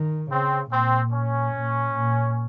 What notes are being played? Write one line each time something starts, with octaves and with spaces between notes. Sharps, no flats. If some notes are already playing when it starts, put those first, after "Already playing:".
Already playing: D#3
C#3 C4
A#2 C4
C#4
A#2
A#2